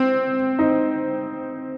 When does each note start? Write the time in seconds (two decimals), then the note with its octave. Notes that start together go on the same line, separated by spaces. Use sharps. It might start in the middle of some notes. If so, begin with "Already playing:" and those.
Already playing: C4
0.59 D#4